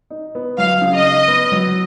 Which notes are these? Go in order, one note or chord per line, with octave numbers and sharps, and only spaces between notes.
D#4
B3
F#3 F5
C#3
D#5
D#4
B3
F#3